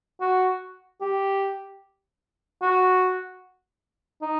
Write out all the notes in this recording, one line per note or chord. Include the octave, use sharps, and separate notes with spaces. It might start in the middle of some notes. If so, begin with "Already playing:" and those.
F#4
G4
F#4
D#4